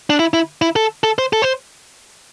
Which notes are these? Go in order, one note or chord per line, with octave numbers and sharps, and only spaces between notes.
D4
E4
E4
E4
A4
A4
C5
A4
C5